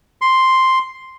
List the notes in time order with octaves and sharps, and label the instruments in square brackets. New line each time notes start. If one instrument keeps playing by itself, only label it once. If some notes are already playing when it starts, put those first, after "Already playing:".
[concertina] C6